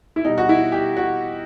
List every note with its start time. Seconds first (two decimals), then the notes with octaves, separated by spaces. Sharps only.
0.16 E4
0.25 B2 G3 D#4
0.38 F#4
0.49 E4
0.72 G4
0.97 F#4